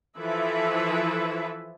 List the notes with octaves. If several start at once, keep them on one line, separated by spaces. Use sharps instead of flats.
E3 F3 E4 A4 B4 E5